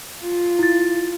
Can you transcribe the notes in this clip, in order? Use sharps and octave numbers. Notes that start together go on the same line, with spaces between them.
F4
E4 A6